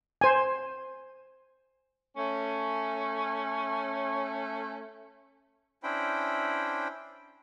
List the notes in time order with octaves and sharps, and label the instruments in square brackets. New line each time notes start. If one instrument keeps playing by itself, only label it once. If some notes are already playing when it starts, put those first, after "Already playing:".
[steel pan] C5 G#5
[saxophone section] A3 C#4
[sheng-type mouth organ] C#4 D4 E4 C5 G5 B5